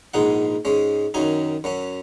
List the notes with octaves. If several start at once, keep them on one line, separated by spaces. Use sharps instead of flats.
A#1 G#2 G#3 D#4 F#5
G#2 G#3 C#4
F#2 D#3 F#3 D#4 G#5
F#2 F#3 C#4